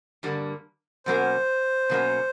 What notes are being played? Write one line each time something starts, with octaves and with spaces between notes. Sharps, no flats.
G2 D3 G3 A#3
B2 F#3 A#3 C#4 C5
B2 F#3 A#3 C#4